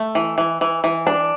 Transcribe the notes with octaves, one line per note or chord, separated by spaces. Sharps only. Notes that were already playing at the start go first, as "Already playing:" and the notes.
Already playing: A3
E3
E3
E3
E3
D4